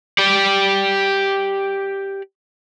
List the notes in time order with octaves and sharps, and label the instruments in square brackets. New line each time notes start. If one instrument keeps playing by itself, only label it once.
[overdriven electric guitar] G4 D5